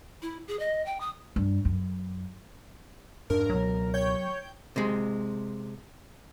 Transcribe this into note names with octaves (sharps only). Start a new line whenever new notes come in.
E4
G#4
D#5
G5
D#6
G2
F#2
F2 G#2 D4 A#4
C#2 B2 F#3
C#5 G5 G6
C3 G#3